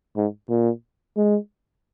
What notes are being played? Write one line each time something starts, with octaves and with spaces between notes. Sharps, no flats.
G#2
A#2
G#3